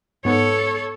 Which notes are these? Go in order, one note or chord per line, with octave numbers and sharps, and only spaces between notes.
G#2 B3 A4 C#5